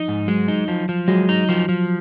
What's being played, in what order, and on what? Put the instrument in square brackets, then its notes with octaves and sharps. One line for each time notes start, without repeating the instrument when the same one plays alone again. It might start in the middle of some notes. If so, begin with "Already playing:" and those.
Already playing: [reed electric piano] F3 [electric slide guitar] D#4
[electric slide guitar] G#2
[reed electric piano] F#3 [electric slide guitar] G#3
[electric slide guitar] D#4
F3
F3
[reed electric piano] F#3 [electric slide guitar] G#3
[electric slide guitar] D#4
F3
F3